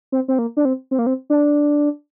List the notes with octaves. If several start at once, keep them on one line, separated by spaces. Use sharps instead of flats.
C4
C4
A#3
D4
C4
C4
A#3
C4
D4